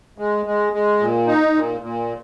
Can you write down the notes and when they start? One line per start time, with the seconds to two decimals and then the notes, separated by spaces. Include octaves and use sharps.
0.18 G#3
0.46 G#3
0.73 G#3
1.00 A#2
1.27 D#4
1.54 A#2
1.81 A#2